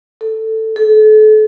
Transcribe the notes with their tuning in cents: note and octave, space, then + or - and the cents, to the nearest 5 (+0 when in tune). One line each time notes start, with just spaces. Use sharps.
A4 +10
A4 -35